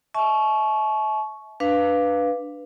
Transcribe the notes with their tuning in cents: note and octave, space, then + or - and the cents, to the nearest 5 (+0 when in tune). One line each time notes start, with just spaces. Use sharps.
E5 -30 A5 -40 C#6 +0
D4 +0 B4 +0 F5 +0